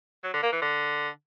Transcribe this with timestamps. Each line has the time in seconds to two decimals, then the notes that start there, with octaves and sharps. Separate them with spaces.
0.24 F#3
0.33 D3
0.43 A#3
0.52 E3
0.62 D3